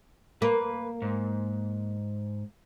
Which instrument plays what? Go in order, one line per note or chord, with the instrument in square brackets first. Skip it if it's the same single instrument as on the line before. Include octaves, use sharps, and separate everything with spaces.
[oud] A#3 [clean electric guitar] B4
[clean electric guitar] G#2